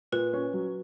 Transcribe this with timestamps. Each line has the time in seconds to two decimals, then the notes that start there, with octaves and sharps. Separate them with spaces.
0.12 A#2 B4
0.33 C#4
0.53 F#3